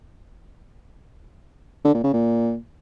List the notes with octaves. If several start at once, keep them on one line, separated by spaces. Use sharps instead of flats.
D3
A#2
C#3
A#2